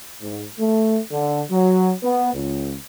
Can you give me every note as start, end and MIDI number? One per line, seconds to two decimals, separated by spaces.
0.21 0.45 44
0.59 0.99 57
1.12 1.42 50
1.50 1.93 54
2.03 2.31 59
2.34 2.74 37